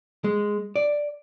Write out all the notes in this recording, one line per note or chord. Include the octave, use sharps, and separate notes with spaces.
G#3
D5